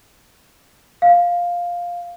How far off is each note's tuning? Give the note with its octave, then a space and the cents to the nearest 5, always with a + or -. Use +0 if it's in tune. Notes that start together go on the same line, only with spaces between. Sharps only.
F5 +5